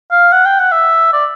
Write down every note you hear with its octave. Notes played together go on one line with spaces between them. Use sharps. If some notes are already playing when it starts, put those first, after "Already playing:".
F5
F#5
G5
F#5
E5
D5